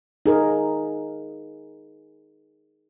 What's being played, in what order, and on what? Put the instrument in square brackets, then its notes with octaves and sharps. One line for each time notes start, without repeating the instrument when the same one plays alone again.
[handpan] D#4 G#4 A#4